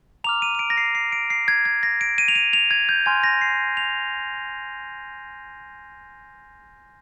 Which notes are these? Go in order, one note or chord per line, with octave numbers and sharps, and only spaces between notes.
A#5 D6 F6 F7
D#7
D#7
D7
A#6
C7
C7
D7
C7
G#6
G#6
A#6
D7
D#7
F7
D#7
F7
G#6
G6
G#5 C6 F6 G#6
A#6
C7
F7